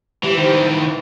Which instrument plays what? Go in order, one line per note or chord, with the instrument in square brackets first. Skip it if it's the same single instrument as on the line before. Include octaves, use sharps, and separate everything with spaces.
[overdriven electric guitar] E3 [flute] G4
[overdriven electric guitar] D#3 E3 [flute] C5
[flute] B4